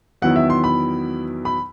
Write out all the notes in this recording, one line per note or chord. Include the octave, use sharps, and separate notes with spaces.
E2 D#3 F#3 B3 E4 F#5
E5
C6
B5
B5